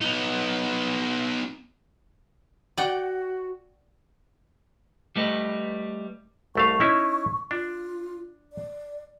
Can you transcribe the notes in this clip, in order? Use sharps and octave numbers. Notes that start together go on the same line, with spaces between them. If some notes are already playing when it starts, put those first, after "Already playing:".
B3 D#4
F#4 D5 F#5 G5
G3 A3 B4 D#5
C2 A3 F5 C#6
C#4 D#4 E4
D4 F4
D5